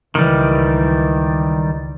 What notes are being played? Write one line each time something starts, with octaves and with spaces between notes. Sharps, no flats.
C#2 D#3 E3 G3